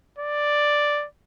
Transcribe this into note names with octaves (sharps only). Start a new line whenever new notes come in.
D5